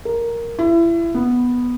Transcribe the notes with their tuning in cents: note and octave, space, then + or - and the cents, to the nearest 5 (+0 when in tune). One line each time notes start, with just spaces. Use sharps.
A#4 +0
E4 +30
B3 -5